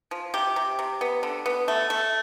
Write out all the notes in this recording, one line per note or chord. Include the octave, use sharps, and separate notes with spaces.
F3
C3 G4
C3
C3
B3
D3
B3
A3
A3